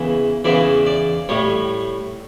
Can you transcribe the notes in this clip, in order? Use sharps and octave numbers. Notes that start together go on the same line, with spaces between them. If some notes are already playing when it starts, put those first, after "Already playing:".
Already playing: E2 C#3 E3
E2 C#3 E3 D5
D5
A2 G3 C#5